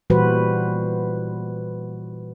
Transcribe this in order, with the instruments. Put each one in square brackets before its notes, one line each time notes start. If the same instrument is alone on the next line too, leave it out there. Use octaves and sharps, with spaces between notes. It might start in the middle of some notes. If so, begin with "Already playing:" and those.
[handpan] A#2 E3 G3 F#4 B4 C5